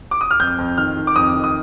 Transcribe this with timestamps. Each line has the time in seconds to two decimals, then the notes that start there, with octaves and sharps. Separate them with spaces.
0.11 D6
0.21 D#6
0.31 F6
0.40 F2 G6
0.58 F2
0.78 D#3 F6
0.97 D#3
1.07 D6
1.16 F2 D#6
1.35 D#3
1.44 D#6